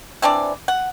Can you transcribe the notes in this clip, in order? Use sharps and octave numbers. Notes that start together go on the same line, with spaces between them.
E3 C4 D4 D5
F#5